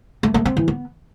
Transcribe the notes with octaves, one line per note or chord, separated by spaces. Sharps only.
A3
A3
C4
E3
B3